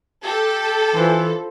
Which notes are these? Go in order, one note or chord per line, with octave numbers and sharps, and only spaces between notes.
G4 A4
E3 F3 E4 C5